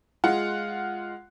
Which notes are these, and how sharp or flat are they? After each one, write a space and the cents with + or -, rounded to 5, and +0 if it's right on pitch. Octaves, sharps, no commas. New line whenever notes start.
G#3 +0 F4 +0 F#5 +0